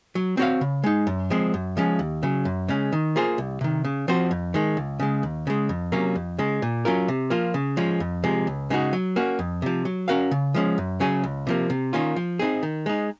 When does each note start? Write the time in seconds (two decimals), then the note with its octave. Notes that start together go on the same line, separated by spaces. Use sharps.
0.15 F#3
0.37 C4 F#4 C#5 F5
0.61 C#3
0.84 G#3 D#4
1.07 F#2
1.30 F3 G#3 C4
1.54 F#2
1.77 F3 G#3 C#4
1.99 D#2
2.23 C#3 F#3
2.45 F#2
2.68 C#3 G#3 C#4
2.92 D#3
3.16 A#3 F4 G#4 C5
3.38 C2
3.61 C3 D#3
3.84 C#3
4.08 F3 C4 F#4 C5
4.31 F2
4.54 D#3 G#3
4.77 C#2
5.00 C#3 G#3
5.23 D#2
5.47 C#3 G#3
5.69 F2
5.92 C3 F#3 A#3 C#4
6.15 F2
6.38 C#3 G#3
6.62 A#2
6.85 F#3 C#4 F4 A#4
7.08 C3
7.30 F3 A#3 F4
7.54 C#3
7.77 F3 G#3 C#4
8.00 F2
8.24 C3 F3 G#3
8.47 C#2
8.70 C#3 G#3 D#4 F#4
8.93 F#3
9.16 A#3 C#4 F#4
9.39 F2
9.62 C3 F3
9.85 F#3
10.08 C#4 F#4 A#4 F5
10.31 C#3
10.54 F3 G#3 C#4
10.78 F#2
11.00 C#3 F#3 C#4 G#4
11.24 C#2
11.47 C3 F3 A#3
11.70 C3
11.93 D#3 A#3 C#4 F4
12.16 F3
12.39 C4 D#4 G#4
12.63 D#3
12.86 G#3 D#4